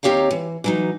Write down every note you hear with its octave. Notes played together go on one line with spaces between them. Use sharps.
D#2 C4 G4 C#5 F5 A#5
E3
E3 F#3 D#4